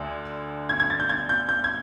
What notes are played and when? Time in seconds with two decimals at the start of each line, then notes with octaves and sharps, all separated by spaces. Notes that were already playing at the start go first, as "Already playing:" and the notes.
Already playing: D2 D3
0.69 G#6
0.80 G#6
0.90 A6
1.00 G6
1.09 G#6
1.29 G6
1.49 G6
1.64 G#6